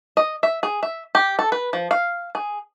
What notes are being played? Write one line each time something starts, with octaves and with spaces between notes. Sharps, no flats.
D#5
E5
G#4
E5
G4
A4
B4
F3
F5
G#4